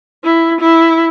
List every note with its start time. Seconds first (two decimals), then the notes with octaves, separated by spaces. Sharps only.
0.24 E4
0.61 E4